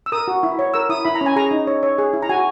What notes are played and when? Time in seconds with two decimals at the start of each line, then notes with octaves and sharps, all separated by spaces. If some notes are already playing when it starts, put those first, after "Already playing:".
0.06 E6
0.12 A#4 D#6
0.28 F#4
0.43 E4
0.59 C#5
0.74 A#4 E6
0.90 E4 D#6
1.05 E4 B5
1.15 A#5
1.21 C#4
1.26 G#5
1.36 G#4 A#5
1.51 D#4
1.67 C#5
1.83 C#5
1.98 G#4
2.13 E4
2.22 A#5
2.29 F#4 G#5